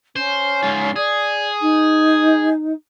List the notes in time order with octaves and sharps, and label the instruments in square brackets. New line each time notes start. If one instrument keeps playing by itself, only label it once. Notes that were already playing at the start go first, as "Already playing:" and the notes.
[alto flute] C#4 [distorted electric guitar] C5
[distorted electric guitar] G#2 F4
[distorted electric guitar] G#4 [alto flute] D5
[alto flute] D#4